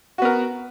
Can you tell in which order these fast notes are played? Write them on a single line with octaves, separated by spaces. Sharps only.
F#4 B3 A#4